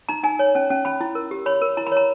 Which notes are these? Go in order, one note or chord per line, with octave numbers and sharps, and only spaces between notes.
D#4 A#5
D#4 G#5
C#5
C#4
C#4
C#4 B5
E4
A#4
G4
C#5 B5
A#4
E4 A#5
B5
C#5
A#5